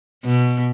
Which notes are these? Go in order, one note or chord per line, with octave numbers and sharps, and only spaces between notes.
B2